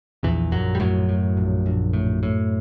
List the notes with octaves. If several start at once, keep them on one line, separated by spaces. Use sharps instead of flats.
A#1 E2 E3
A#1 F#2 F#3
G3
F#2 A2 F#3
A2
A#1
A#1
A2
A2